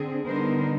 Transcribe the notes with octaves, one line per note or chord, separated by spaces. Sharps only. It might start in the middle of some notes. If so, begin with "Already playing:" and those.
Already playing: D3 C4 G#4
D3 G3 B3 D#4 A#4 C5